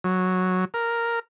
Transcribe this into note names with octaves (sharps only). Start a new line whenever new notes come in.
F#3
A#4